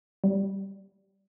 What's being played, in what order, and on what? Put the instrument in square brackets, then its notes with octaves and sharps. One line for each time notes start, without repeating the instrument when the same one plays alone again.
[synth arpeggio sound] G3